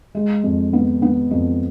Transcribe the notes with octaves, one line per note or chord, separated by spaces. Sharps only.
G#3
F2
B3
B3
F2